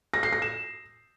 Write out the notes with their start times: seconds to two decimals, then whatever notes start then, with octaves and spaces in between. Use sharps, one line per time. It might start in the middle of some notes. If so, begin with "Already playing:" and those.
0.14 A#6
0.23 C7
0.32 A#6
0.42 E7